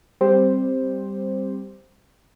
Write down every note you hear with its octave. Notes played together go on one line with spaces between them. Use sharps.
G3 C4 G4 C5